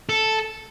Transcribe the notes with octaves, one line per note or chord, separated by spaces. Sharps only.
A4